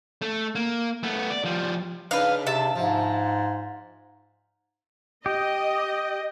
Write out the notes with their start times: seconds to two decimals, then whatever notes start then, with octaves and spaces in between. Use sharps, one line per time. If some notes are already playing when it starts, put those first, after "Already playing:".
0.22 A3
0.55 A#3
1.03 A3 B3
1.30 D5
1.45 F3 G3
2.11 C#3 D4 D#4 B4 F5
2.47 C3 E5 A5
2.75 G#2 F3
5.26 G4 D#5